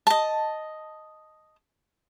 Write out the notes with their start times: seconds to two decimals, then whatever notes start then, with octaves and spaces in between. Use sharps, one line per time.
0.07 D#5 A5